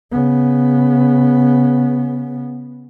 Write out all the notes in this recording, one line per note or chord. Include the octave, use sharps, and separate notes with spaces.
C#3 B3